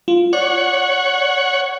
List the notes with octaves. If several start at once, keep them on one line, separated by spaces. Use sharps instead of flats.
F4
C#5 D5 F#5